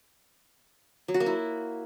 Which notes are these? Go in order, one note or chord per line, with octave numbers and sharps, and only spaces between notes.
F#3
F#4
A#3
E4